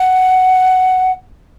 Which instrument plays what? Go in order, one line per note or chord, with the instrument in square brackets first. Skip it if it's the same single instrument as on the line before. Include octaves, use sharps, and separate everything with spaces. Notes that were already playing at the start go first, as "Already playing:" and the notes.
Already playing: [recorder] F#5